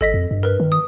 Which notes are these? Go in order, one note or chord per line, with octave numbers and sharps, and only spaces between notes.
G#1 A4 D#5 B6
F2
G2
A#4 B4
D#3
D#6